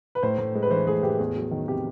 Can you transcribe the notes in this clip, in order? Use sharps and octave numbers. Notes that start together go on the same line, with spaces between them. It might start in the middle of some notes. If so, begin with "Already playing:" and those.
B4
A2 C5
A2
G#3
B4
E3 C5
A2 G#4
A2 G4
E2 G#4
F#3
D#3
C3 G4